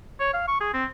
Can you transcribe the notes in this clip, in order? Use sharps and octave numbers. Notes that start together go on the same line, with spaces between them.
C#5
F5
C#6
G#4
C4